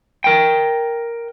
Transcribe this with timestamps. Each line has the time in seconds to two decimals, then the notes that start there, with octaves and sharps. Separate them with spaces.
0.24 A#4 G5